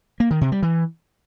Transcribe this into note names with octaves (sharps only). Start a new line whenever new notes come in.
A#3
D#3
C3
G3
E3